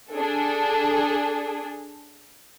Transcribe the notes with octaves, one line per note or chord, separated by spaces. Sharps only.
D4 G#4 A4